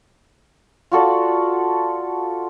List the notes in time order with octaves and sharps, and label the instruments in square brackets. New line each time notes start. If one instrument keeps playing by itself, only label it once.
[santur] F4 F#4 A4 D5